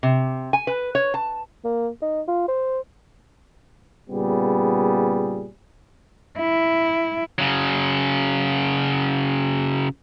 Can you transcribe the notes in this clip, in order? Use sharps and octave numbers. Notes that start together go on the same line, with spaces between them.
C3
G#5
B4
C#5
A5
A#3
D#4
F4
C5
A#2 C#3 G3 B3 G#4
E4
C#3 F#3